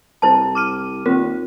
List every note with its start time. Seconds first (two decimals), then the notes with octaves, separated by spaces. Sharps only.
0.22 C2 E4 C5 A5
0.55 D6 F6 D#7
1.06 D#2 C4 F4 A#4